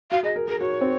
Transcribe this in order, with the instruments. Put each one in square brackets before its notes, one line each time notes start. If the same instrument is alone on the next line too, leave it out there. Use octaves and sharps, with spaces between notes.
[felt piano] F#4 [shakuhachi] F5
[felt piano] G#4 [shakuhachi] D#5
[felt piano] A#4
[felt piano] G#4 [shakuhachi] A#4
[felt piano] F#4 [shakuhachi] C#5
[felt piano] C4